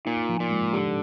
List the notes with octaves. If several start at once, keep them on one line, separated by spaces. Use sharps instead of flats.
A#2 D#4
F3
A#2
G#3
D3 G4